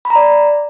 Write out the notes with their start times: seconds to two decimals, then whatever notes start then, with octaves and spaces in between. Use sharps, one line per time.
0.05 B5
0.10 A#5
0.16 D5